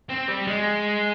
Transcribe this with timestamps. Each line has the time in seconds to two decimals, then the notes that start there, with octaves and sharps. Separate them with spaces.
0.09 C4
0.28 G3
0.47 G#3